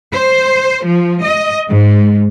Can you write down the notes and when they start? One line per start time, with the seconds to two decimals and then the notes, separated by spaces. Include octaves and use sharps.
0.12 C5
0.85 F3
1.22 D#5
1.68 G#2